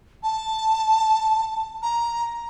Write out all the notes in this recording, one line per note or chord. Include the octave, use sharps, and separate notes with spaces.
A5
A#5